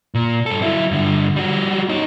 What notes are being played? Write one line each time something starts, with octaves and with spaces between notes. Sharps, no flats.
A#2
G2 A4
F#3 E4
G2 D3
G3 F#4
D#4 C#5